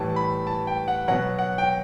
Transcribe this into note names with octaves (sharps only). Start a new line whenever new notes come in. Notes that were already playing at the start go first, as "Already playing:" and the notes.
Already playing: A2 E3 G3 A5
B5
A5
G5
F#5
B2 F#3 F#5
F#5
G5